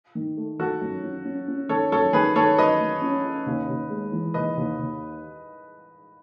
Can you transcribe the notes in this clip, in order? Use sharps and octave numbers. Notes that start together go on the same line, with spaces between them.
D#3
A3
D#3 F#4 A4
F#2
C#4
C#4
C#4
D#3 A4 C#5
F#2 A4 C#5
D#3 G#4 B4
D#3 A4 C#5
F#2 B4 D#5
A3
C#4
C#4
D#2
D#2
G#3
E3
D#2 B4 D#5
D#2
D#2